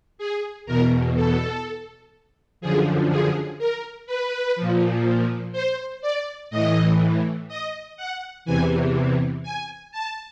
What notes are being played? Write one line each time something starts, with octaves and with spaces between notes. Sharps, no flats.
G#4
E2 B2 A#4
A4
F#2 D3 F3 G#4
G#4
A#4
B4
A#2 F3
C5
D5
A2 E3 D#5
D#5
F#5
E2 C3 E3 G#5
G#5
A5